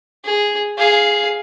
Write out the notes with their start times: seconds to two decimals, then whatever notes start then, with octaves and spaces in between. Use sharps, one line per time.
0.24 G#4
0.77 G#4 F5